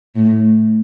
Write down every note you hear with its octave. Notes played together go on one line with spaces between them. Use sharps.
A2